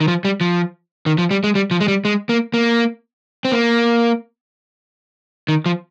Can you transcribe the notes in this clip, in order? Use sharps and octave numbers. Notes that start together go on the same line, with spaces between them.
D#3
F3
G3
F3
D#3
F3
G3
G#3
G3
F3
G#3
G3
G#3
A#3
A#3
C4
A#3
D#3
F3